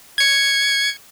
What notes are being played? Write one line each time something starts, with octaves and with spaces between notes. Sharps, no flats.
G#6 C#7